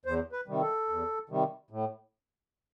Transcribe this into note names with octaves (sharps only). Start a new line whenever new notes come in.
E2 C5
B4
C3 D#3 G3
A4
E2
C3 D#3 G3
A2